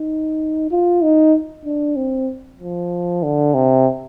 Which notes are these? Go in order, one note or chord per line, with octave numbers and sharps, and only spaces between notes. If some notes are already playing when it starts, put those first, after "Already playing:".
Already playing: D#4
F4
D#4
D4
C4
F3
D3
C3